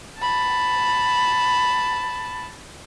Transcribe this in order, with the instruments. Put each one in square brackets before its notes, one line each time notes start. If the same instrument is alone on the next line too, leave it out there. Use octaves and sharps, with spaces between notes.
[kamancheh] A5 B5